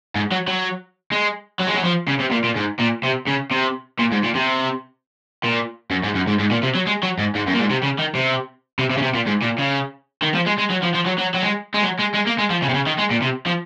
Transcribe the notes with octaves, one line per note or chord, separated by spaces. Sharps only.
G#2
F#3
F#3
G#3
F#3
G#3
F#3
F3
C#3
C3
A#2
A#2
G#2
A#2
C3
C#3
C3
A#2
G#2
A#2
C3
A#2
F#2
G#2
F#2
G#2
G#2
A#2
C3
F#3
G#3
F#3
G#2
G#2
F#2
A#2
G#2
C3
C#3
D#3
C3
C3
C3
C#3
C3
A#2
G#2
A#2
C#3
D#3
F3
G#3
G#3
F#3
F3
F3
F#3
F#3
F#3
G#3
G#3
F#3
G#3
G#3
A#3
G#3
F3
C#3
C3
C#3
D#3
G#3
A#2
C3
F3